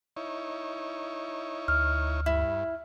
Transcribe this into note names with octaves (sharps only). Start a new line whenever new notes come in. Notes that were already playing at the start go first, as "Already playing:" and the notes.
D#4 E4 C#5
D2 F6
G2 E4